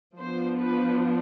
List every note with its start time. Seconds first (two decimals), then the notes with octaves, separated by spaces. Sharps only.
0.19 F3 B3 D4 C5
0.61 B4